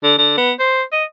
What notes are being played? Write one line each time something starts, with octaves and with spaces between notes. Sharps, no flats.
D3
D3
B3
C5
D#5